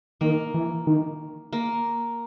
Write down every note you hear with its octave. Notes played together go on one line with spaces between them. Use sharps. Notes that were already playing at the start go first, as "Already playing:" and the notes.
D#3 A#3
E3
D#3
A#3